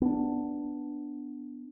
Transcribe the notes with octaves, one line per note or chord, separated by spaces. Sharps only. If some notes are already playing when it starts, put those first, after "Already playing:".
B3 D4